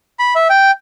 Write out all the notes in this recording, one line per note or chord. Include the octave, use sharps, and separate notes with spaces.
B5
E5
G5